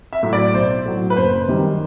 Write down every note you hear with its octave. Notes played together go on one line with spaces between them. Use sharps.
E5
A2 F#3
D5
B1 C5
A2 F#3
B4
F#1 C5
F#2 D#3 G3